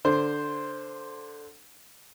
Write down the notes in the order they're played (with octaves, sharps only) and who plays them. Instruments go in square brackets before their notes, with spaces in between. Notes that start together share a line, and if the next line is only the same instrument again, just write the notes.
[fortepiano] D3 C5